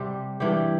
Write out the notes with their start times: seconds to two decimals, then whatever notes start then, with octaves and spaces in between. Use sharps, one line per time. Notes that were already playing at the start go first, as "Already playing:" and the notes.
Already playing: C3 G3 G4
0.40 G2 E3 G3 G4